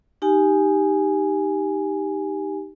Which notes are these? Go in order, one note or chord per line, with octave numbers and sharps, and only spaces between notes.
D#4 G4 G#5